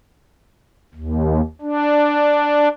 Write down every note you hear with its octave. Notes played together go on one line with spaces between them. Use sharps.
D#2
D4